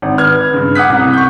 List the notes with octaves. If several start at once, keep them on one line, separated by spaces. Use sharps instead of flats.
G#1
B4 F6 G#6
G2 C#3
F#5 D6 D#6 F#6 B6
C2
C#6 G6